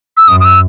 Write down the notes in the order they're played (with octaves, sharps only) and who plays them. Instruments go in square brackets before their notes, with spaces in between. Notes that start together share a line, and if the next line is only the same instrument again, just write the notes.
[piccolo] E6
[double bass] F#2 [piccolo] D#6
[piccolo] D#6
E6